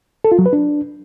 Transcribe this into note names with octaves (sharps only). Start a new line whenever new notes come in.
A4
F4
F#3
B4
D4